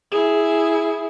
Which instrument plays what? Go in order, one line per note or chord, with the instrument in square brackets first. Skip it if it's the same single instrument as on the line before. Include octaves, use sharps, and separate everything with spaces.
[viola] E4 G#4